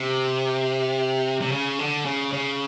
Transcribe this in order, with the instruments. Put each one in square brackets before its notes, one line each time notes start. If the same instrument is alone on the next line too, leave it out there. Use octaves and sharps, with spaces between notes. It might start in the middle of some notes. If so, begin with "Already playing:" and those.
Already playing: [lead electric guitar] C3
C3
C#3
D3
C#3
C#3